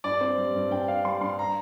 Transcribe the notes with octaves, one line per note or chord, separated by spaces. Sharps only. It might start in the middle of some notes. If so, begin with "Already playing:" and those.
G2 D5
C4
G3
G2
G2 G5
C4 F5
G3 C6
G2 C6
A#5